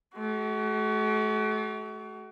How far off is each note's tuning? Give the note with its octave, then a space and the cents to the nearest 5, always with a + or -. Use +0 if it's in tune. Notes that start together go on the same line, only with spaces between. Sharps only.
A3 -40 F#4 +30